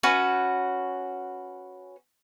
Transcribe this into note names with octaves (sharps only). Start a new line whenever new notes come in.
C#4 F#4 B4